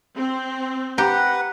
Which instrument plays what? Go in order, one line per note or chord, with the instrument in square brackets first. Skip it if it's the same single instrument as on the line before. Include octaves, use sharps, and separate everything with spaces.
[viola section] C4
[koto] G4 [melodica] B4 F#5 [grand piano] A#5